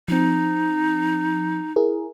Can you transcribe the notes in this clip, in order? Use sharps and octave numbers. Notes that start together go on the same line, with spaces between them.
F3 C4 D#4
E4 G#4 A#4